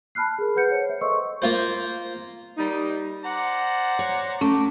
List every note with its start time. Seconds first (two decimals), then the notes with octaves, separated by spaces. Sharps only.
0.15 A5 B5 F6 F#6 C7
0.38 G#4 A#4
0.55 G#4 B4 F#5 G6 C#7
0.71 C5 C#5
0.89 E5
1.01 A4 C5 D#5 C6 C#6 E6
1.42 A#3 F4 C5
2.58 G3 A#3 D#4
3.24 C5 D5 F#5 A#5
3.99 C#5
4.41 A3 C#4 D6